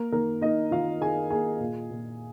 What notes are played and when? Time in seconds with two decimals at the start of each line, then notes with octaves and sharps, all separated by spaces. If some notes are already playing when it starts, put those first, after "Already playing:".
Already playing: A#3 A#4
0.12 D#3 A#3 A#4
0.41 A#3 D#4 D#5
0.71 D#3 F4 F5
1.01 D#3 G#4 G#5
1.30 A#3 G#4 G#5
1.60 A#2
1.90 A#2